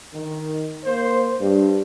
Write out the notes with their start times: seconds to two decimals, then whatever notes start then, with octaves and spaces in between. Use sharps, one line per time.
0.14 D#3
0.85 A#3 C5
1.40 G2